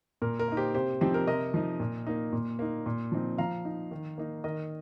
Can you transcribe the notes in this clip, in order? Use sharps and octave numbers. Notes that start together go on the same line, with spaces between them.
A#2 A#4
A#4
A#3 D#4
G4 C5
C3 G4 C5
F3 C4 D#4 G4 C5
A#4
C3 A#4 D#5
F3 D#4
A#2
A#3 D#4
A#2
A#3 D#4
A#2
F3 C4 D#4
F3 F5 A#5
D#4
D#3
A#3 D#4
D#3 A#4 D#5